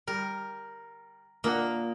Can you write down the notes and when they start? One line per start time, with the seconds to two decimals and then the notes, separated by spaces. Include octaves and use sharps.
0.07 G3 A#4
1.44 A#2 A#3 D4 A#4 D#5 F#5